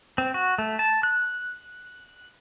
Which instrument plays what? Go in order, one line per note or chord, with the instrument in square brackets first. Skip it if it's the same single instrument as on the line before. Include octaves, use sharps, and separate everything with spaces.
[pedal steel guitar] C4
F#4
A3
A5
F#6